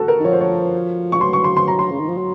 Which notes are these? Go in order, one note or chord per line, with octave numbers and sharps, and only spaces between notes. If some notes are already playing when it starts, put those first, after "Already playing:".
Already playing: F#4 A4
A#4
D#3
F3 C#5
C5
C#5
C#6
F#3 C6
C#6
C6
C6
A#5
C6
C#3
D#3
F3
F#3